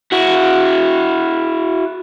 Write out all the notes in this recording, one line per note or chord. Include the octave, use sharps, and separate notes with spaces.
E4 F#4